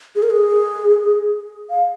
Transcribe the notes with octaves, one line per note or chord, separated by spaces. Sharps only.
G#4
A#4
G#4
F5